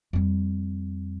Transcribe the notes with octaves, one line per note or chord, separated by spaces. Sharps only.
F2 G3